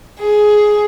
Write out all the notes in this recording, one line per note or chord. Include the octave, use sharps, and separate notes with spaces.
G#4